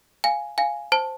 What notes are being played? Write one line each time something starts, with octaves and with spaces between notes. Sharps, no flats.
F5 G#5
F5 G#5
C5 A5